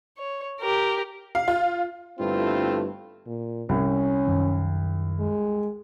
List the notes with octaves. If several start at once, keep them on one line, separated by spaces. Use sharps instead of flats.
C#5
G4 A#4
F5
F4
G1 G2 A3 C4 E4 F4
A#2
C2 C#4
F#2 D#3
G#3